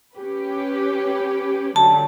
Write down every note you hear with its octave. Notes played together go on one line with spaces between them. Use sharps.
C#4 G4 B4
D3 F#3 G3 A5